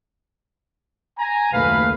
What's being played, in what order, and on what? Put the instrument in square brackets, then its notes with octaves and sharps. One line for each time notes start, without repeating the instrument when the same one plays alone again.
[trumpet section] G#5 A#5
[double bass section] F#1 D#2 A3 [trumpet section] B4 F5